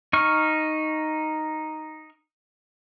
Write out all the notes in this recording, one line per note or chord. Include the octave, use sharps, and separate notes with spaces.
D#4 C#6 F6